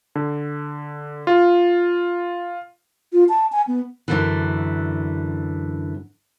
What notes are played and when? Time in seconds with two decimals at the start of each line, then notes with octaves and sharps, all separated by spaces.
0.15 D3
1.27 F4
3.13 F4
3.29 A5
3.52 G#5
3.67 B3
4.08 F#2 D3 E3